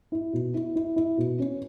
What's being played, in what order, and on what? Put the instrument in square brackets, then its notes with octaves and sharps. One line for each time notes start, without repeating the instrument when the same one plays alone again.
[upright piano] E4
B2
E4
E4
E4
B2
C#4